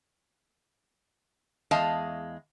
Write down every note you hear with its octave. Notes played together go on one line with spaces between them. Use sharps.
E2 G#3 D#5 F5 A5